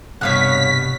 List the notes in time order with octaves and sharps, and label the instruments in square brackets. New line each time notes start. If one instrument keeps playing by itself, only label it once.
[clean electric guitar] C2 G2 B2 [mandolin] C#5 F5 F#5 [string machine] B6